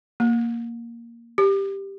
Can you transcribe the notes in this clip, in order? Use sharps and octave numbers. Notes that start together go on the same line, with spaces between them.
A#3
G4